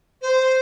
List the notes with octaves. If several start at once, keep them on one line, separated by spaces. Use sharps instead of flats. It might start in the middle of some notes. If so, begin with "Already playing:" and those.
C5